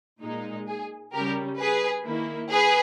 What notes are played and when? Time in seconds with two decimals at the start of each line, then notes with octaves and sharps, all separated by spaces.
0.21 A#2 G#3 D#4
0.67 G#4
1.13 C#3 G3 C#4 G4 A#4
1.59 G#4 B4
2.05 D#3 A#3 E4
2.51 G#4 B4